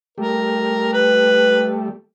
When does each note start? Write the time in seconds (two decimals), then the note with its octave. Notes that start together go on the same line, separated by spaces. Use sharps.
0.18 G3 A3 A#4
0.93 B4